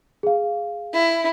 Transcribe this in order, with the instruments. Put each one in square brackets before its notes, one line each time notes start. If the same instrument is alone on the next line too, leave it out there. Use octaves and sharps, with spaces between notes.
[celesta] G#4 F5
[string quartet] E4